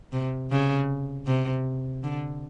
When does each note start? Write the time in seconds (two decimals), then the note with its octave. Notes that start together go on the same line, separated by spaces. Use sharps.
0.12 C3
0.51 C#3
1.26 C3
2.03 D3